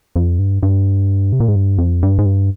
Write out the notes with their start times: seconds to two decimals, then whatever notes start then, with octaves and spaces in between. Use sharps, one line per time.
0.16 F2
0.39 G2
0.63 G2
1.32 C3
1.40 A#2
1.48 G#2
1.56 G2
1.78 F2
2.03 G2
2.18 G#2
2.25 G2